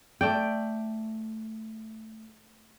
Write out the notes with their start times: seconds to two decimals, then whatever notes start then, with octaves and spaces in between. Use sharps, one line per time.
0.21 A3 D5 G5